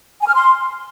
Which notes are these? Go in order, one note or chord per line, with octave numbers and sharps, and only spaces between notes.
G#5
F6
C6